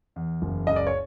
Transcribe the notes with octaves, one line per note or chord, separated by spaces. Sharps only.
E2
F#1
C#2 D#5
D5
C#5